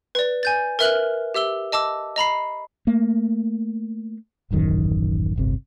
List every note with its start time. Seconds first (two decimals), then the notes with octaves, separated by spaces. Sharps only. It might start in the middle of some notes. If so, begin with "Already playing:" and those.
0.15 B4 D5
0.43 G#5 G6 A6
0.79 A#4 B4 E5 F6 F#6 F#7
1.34 G4 E5 E6 G7
1.72 D#5 A5 D6 E6
2.16 D#5 A#5 B5 C7
2.87 A3 A#3
4.51 D#1 A1 F#2 D#3
5.36 D1 G1 C3